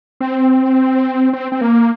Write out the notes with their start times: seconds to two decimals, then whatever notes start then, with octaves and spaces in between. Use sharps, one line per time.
0.21 C4
1.33 C4
1.52 C4
1.61 A#3